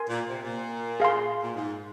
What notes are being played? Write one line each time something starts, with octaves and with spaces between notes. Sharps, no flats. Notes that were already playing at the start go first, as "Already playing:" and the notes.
Already playing: A#4 G#5 C6
A#2
C3
A#2
G#4 F5 C6
A#2
G#2